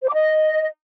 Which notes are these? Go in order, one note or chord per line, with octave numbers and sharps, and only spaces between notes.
C5
D6
D#5